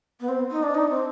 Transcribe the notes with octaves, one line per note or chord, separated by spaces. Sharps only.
B3
C4
D#4
D4
D#4
C4